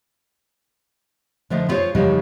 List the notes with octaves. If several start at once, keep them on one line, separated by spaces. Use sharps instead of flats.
D3 F3 A3 D#4
E4 F4 G#4 C5 C#5
E2 C#3 F3 G3 G#3 D#4